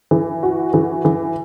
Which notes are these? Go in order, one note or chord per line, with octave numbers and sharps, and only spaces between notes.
E3
F#4
E3
E3